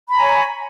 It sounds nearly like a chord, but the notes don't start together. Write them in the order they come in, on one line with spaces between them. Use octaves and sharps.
B5 A#5 G#5 C#5